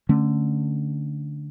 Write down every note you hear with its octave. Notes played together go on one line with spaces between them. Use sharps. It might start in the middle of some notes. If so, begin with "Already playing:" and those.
D3 A3 C#4